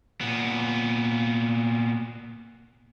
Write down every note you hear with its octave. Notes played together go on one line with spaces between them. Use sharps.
A#2 B3